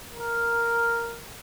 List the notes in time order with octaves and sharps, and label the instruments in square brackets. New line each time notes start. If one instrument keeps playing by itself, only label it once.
[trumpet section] A#4